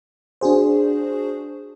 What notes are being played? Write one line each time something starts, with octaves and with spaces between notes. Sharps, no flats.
D4 F#4 G#4 C5